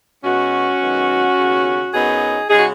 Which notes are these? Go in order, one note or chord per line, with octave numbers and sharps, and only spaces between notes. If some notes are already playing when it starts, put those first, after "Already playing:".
B2 G#3 B3 C#4 F#4
F#2 D#3 G#3 B3
D#2 C#3 B3
F#2 F#3 B3 D#4 G#4
C#3 G#3 D#4 G#4
F#4